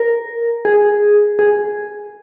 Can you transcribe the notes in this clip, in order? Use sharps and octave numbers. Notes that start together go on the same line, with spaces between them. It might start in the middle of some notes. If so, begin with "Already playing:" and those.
Already playing: A#4
G#4
G#4